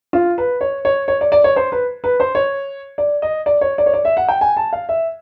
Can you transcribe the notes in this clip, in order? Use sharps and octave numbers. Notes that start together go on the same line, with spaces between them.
F4
B4
C#5
C#5
C#5
D5
D5
C#5
C5
B4
B4
C5
C#5
D5
D#5
D5
C#5
D5
C#5
D5
E5
F#5
G5
G#5
A5
F5
E5